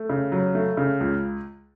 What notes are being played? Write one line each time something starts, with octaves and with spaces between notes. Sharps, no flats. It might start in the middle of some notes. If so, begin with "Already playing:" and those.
Already playing: A3
C#3
F#3
A3
C#3
C#2